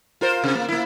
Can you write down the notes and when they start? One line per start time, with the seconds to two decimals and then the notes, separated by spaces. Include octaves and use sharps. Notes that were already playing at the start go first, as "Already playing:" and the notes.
0.21 F4 A#4 C5
0.44 C3
0.55 A#3
0.68 A#3 E4